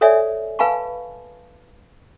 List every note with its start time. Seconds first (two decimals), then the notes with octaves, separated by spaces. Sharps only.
0.01 A4 C#5 D5 E5 G#5
0.59 B4 F5 G#5 A5 B5 C#6